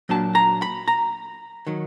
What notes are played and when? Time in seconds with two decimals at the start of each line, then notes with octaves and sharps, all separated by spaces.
0.09 A#2 F#3 A#3 D4 A5
0.35 A#5
0.62 B5
0.88 A#5
1.67 D#3 F#3